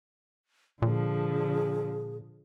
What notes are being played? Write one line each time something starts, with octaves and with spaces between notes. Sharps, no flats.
A#2 D3 F3 G#4